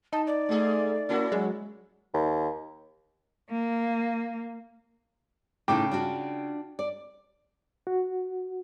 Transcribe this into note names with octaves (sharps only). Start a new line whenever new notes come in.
D#4 A5
D5
G#2 A3 G#4
A#3 C#4 E4 F#4
F#3 G#3
D#2
A#3
A2 C#3 D#4 E4 G5 D6
D4 F4 F#4
D5
F#4